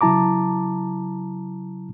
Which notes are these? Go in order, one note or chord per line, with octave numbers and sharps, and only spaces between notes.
C#3 F#3 E4 A5 A#5 D6